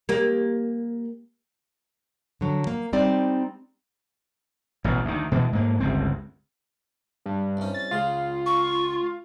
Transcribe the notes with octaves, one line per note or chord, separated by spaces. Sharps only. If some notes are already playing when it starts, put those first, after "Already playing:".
A#3 G4
D3 F#3
A#3
G3 G#3 C4 D#4 D5
A1 B2
D2 D#3
B2 E3 G#3
G#2 A#3
G1 C#2 C4
G2
C2 C#4
A6
C#2 F4 G#4
C#6